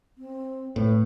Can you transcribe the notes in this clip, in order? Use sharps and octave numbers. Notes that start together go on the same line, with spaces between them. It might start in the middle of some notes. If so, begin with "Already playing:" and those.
C4
A2 B4